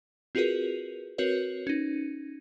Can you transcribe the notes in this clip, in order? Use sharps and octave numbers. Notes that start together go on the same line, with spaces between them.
C4 F4 F#4 G#4 A#4 B4
C4 F#4 A#4 B4 C#5
C#4 D#4